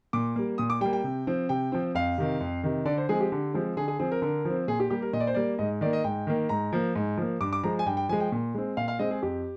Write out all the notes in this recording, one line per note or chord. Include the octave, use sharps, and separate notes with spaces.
A#2 D6
G3 A#3
A#2 D#6
D6
G3 A#3 G5
G5
C3
F3 C4
C3 G5
F3 C4
F2 F5
C3 D#3
F2
C3 D#3
D3 D5
C5
F3 G#3 C4 G#4
G4
D3
F3 G#3 C4
D3 G#4
G#4
F3 C4 G#4
A#4
D3 A#4
F3
C4
A#2 G#4
G4
G3 A#3 G4
A#4
A#2 D#5
D5
C5
G3 A#3 D5
G#2 D#5
D#3 A#3 D5
D#5
G#2 G5
D#3 A#3
G#2 A#5
F3 A#3
G#2
F3 A#3
G2 D6
D6
F3 G#3 A#5
G#5
G2 G5
G5
F3 G#3 G#5
G5
A#2
G#3 C4
A#2 F5
F5
G#3 C4 D#5
G#4
F2 G4